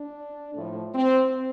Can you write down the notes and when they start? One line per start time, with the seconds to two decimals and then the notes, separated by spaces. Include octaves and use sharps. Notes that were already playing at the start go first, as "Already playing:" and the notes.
Already playing: D4
0.54 A2 F3 A3
0.94 C4